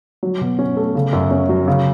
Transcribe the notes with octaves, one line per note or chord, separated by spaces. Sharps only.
F#3
B2
C#4
A3
C#3
F#2
C#4
F#3
C#3